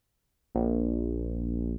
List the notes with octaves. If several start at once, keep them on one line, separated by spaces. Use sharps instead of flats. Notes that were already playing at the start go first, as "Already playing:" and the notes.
A#1